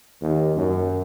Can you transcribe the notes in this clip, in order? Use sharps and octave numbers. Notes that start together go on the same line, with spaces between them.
D#2
F#2